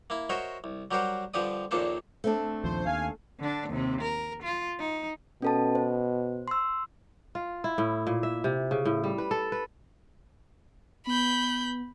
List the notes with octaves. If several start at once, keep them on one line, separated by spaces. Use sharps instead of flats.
A#3 E4
F#4 A#4 C5 C#5 D#5 E5
C2
F#3 G3 G4 A#4 C5 F#5
G2 D3 F3 G4 D5 D#6
A#1 D#2 A#2 D4 A4 C5
A3 C4 D4
A#1 D#2 F3 C5
D#2 F5 G#5
D3 D4
D#2 C3
A#4
F4
D#4
B2 C#4 A4 A5
C5
C6 E6
F4
E4
A2
A#2
E5
C3
C#3
A2
G3
B4
A4
B4
B3 B5 G6